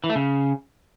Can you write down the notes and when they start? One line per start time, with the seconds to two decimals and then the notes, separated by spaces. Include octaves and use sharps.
0.04 E3
0.10 A3
0.16 C#3